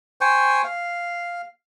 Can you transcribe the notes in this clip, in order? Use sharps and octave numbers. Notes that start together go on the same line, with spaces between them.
C5 G5 G#5 C#6
F5